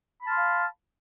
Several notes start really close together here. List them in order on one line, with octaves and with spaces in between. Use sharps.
B5 A5 F6 C6 F5